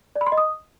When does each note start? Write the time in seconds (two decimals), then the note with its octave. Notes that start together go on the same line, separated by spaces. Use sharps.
0.16 D5
0.21 B5
0.27 C6
0.32 D#5
0.38 D#6